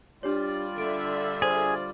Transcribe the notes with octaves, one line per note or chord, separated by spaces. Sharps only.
G3 D4 F4 G4 C#5 D5
D3 E5 D7
G#4 C5